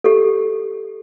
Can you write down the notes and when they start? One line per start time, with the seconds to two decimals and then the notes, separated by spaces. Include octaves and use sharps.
0.04 G4 A4